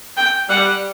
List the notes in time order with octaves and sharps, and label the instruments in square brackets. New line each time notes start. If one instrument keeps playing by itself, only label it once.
[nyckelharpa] G5
[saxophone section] G3 [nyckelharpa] F#5